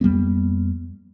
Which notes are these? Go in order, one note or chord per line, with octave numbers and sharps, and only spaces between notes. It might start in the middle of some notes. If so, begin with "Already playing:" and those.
F2 G3 A#3 B3